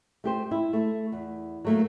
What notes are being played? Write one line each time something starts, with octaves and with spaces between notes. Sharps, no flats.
A3 G4 C5
E4
A3
E2
F#3 A3 A#3